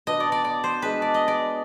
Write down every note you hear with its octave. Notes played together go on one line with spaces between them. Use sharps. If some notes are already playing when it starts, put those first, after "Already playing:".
B2 B3 D4 D#5
D5
D5
D5
C5
G#3 D4 G#4 B4
D5
D#5
D5